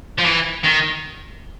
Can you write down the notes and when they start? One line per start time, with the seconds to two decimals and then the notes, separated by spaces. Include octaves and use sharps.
0.18 F3
0.24 E3
0.64 D#3